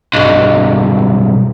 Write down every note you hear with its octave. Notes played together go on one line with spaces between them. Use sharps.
B1 G2